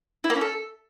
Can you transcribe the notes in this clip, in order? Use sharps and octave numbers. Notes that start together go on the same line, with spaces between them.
E4
A#3
C#4
A4